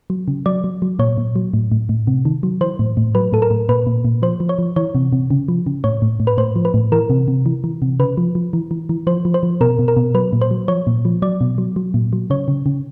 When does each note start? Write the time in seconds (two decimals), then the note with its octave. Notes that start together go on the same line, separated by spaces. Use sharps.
0.10 F#3
0.28 C#3
0.46 F#3 D5
0.64 F#3
0.82 F#3
0.99 A#2 C#5
1.18 A#2
1.36 F#3
1.54 A2
1.72 A2
1.89 A2
2.07 C3
2.25 D#3
2.43 F#3
2.61 E3 C5
2.79 A2
2.97 A2
3.15 F#3 B4
3.32 A2 A4
3.42 A#4
3.51 A2
3.69 A#2 B4
3.87 A#2
4.05 A#2
4.22 F3 C5
4.40 F3
4.49 C#5
4.59 F3
4.76 E3 C#5
4.95 C3
5.12 C3
5.30 C#3
5.48 F3
5.66 C#3
5.84 A2 C#5
6.02 A2
6.20 A2
6.27 B4
6.38 A2 C5
6.56 F3
6.65 B4
6.74 A2
6.92 E3 A#4
7.10 C3
7.28 C3
7.46 E3
7.64 E3
7.82 C3
8.00 C#3 B4
8.18 F3
8.35 F3
8.53 E3
8.71 E3
8.89 E3
9.07 F3 C5
9.25 F3
9.34 C5
9.43 F3
9.61 B2 A#4
9.79 B2
9.88 A#4
9.97 B2
10.14 F#3 B4
10.33 A#2
10.41 C5
10.51 F#3
10.68 F3 C#5
10.87 A#2
11.05 F3
11.22 F#3 D5
11.41 B2
11.58 F#3
11.76 F#3
11.94 A#2
12.13 F#3
12.30 C#3 C#5
12.48 C#3
12.66 C#3